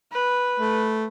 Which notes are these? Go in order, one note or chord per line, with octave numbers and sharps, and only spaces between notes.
B4
A3